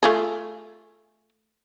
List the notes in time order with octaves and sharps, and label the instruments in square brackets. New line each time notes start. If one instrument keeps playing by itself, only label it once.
[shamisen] A3 F4 G#4